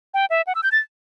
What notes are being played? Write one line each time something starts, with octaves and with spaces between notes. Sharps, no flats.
G5
E5
F#5
E6
G6
A6